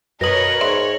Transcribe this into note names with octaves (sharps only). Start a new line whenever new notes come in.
F#2 B2 A#4 B4 C#5 D#6 A#6 F#7
G#2 C#5 D5 E5 C6